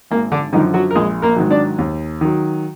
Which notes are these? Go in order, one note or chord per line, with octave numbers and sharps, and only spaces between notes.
G#1 A#3
D3 D4
F#2 D3 D#3 F3 D#4
F#3 F#4
A#4
A#1 G#3 G#4
A#3 A#4
G#2 D#3 F#3
D4 D5
D#2
D#3 F#3